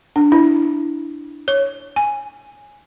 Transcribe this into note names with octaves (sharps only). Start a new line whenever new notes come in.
D4
E4
C#5
G#5